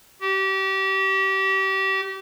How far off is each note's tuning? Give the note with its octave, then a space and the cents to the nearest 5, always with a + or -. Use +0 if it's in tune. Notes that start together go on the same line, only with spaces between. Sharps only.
G4 -30